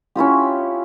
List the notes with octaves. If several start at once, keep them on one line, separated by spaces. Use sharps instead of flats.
C#4 E4 F4 G4